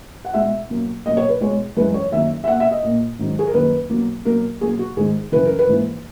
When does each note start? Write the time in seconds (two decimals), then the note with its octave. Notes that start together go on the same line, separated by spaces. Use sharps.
0.25 F#5
0.34 B2 G#3 E5
0.70 B2 F#3 A#3
1.06 B2 F#3 A#3 D#5
1.17 C#5
1.29 B4
1.41 B2 G#3 C#5
1.77 F#2 E3 G#3 B4
1.94 C#5
2.11 F#2 D#3 F#3 A#3 E5
2.44 E5
2.48 A#3 F#5
2.51 B2
2.60 E5
2.71 D#5
2.84 A#2 A#3
3.19 G#2 D#3 F#3
3.39 G#4
3.47 A#4
3.54 F#2 D#3 F#3 A#3 B4
3.89 B2 F#3 A#3
4.25 B2 F#3 A#3 A#4
4.61 B2 F#3 A#3 G#4
4.79 F#4
4.97 G#2 D#3 G#3 G#4
5.32 F#2 C#3 E3 B4
5.45 A#4
5.59 B4
5.67 G#2 E3 A#3